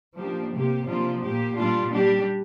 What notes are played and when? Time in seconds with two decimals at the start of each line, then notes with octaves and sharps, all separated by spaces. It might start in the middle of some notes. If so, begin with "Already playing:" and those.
0.17 F3 A#3 D4 G4
0.52 C3 A#3 G4
0.87 C3 F3 A#3 D4 F4
1.22 A#2 A#3 G4
1.57 A#2 G3 D4 F4
1.92 G3 D4 G4